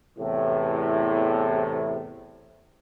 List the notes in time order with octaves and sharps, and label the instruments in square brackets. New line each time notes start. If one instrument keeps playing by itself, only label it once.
[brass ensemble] E2 A2 C3